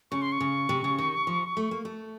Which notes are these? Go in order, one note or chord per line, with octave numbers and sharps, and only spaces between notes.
C#3 C#6
C6
C#6
C#3
C3
C#3
D#3
F3
A3
A#3
A3